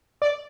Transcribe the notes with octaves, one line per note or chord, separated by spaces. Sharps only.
D5